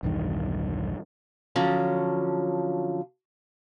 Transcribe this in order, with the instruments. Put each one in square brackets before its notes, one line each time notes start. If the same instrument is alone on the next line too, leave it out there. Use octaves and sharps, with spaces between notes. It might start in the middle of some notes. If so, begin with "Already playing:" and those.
[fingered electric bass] B1 E2 G2 D#3
[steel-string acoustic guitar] D3 F3 F#3 C#4